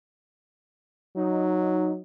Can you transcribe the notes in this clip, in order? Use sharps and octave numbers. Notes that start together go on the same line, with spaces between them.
F#3 D#4